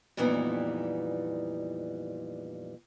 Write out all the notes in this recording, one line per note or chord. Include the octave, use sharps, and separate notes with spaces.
F2 A#2 E3 G3 B3 D#4